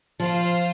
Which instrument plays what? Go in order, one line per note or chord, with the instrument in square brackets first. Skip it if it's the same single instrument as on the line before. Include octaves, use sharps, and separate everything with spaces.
[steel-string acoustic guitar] F3 [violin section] F4 C5 F5